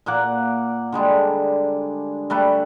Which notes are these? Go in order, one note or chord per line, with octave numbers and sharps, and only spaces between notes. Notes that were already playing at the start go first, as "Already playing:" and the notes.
A#2 A#3 F#5 D6
D3 G3 G#3 D4
G3 A3 B4